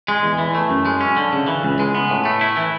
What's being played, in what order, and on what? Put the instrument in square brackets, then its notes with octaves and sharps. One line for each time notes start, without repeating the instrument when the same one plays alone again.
[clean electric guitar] G#3
E2
E3
A3
F#2
G#3
C#4
D3
C#3
E3
C#2
G#3
B3
A2
A3
E4
E3